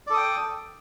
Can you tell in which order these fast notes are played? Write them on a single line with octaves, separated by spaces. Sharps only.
D5 A4 D#6 G5